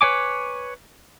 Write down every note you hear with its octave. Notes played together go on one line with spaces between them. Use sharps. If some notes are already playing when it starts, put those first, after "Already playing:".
B4 C#5 G#5 D6